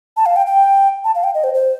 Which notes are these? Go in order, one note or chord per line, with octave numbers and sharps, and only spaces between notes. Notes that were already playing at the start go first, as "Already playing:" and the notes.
A5
F5
G5
G5
A5
F5
G5
D#5
C5
C5